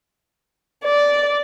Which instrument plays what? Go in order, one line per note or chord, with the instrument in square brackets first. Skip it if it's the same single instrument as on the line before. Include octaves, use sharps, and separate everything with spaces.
[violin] D5